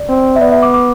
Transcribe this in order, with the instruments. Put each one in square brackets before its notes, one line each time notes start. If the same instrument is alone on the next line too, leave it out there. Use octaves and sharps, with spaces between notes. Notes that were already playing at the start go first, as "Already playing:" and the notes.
Already playing: [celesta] D5
[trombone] C4
[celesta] E5
[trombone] B3 [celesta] D5
[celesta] E5
D6
D6